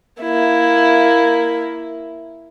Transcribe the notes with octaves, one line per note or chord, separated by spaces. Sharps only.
A#3 E4